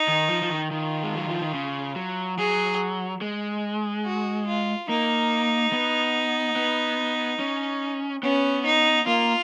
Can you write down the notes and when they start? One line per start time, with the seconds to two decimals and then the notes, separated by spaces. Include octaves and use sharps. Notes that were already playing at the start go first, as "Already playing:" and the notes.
Already playing: D#4
0.08 D#3
0.29 F3
0.42 F3
0.49 D#3
0.71 D#3 F4
1.03 G#3
1.16 F#3
1.28 F3
1.41 D#3
1.54 C#3
1.96 F#3
2.38 F#3 G#4
3.21 G#3
4.05 F#4
4.47 F4
4.89 A#3 D#4
5.73 B3
6.56 B3
7.40 C#4
8.23 B3 C#4
8.65 D#4
9.07 A#3 F4